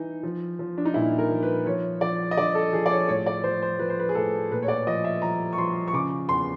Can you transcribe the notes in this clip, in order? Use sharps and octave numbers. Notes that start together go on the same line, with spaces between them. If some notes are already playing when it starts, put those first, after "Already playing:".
Already playing: E3 D#4
F3
F3
D4
D#4
A#2 E4
A#4
F3
B4
F3 C#5
F3 D5
D#5
D3 D5
A4
F3 G#4
D5
C#5
A2 C#5
D5
F3 C5
C5
F3 B4
C5
B4
G#4
A2 A4
A#2 B4
C#5
D5
F3 D#5
E5
F3 A#5
C#6
F3 C6
C#6
C#3 D6
E2 C6